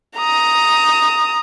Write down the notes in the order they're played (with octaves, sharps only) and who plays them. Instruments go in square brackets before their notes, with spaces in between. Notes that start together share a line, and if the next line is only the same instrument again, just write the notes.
[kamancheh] A#5 D#6